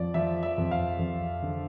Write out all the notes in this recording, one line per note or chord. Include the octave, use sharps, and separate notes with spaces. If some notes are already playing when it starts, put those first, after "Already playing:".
Already playing: F2 F3 D5
F3 E5
E5
F2
F5
F2
D3